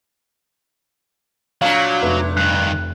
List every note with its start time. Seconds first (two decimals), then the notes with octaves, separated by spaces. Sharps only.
1.62 A#2 F#3 D4 F5 C#6
2.02 F1 B4 E5
2.37 G2 D#3 F#6